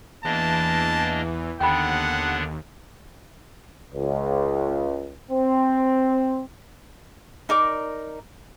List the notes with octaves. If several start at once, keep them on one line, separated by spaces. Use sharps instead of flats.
E2 E3 A#3 D4 D#5 A5
D#2 D3 B3 D4 F#5 G5 B5
C#2
C4
D#4 A#4 D5 D6